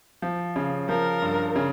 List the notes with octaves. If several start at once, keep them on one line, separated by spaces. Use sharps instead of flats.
F3
C#3
F3 A#4
G2
C#3